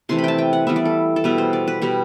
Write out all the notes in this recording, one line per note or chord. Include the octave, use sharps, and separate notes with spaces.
C3 E3 A3 C6
B5
G5 A5
G5
F#5
E3 G3 B3 E5
D5
A4
A4
B2 G3 B3 B4
C5
D5
B4
B2 G3 B3 G4